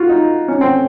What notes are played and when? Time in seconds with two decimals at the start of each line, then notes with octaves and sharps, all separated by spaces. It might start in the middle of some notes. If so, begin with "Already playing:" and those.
Already playing: F4 F#4
0.09 D#4
0.48 C#4
0.61 C4